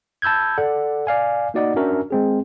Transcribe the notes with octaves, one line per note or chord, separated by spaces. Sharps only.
A5 B5 E6 G6 G#6
A4 D5 F#5
D5 F5 G#5
A#3 D#4 F#4 D5 D#5 F#5
C#4 D4 F#4 A#4 E5
G#3 C4 G#4